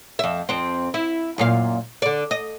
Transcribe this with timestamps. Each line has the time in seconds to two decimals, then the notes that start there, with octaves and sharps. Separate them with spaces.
0.19 F2 E5
0.49 F2 C4
0.94 E4
1.38 F#2 A#2 F5
2.02 D3 D5
2.31 D#5